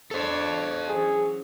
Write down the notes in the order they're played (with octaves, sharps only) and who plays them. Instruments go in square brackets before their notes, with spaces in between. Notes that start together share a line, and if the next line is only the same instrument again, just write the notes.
[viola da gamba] D4 C#5 [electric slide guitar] A4 C5
[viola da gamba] E3 F#3 C#4 [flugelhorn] G#4